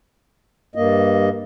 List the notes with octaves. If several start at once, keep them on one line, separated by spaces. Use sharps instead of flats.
G2 A#3 D#5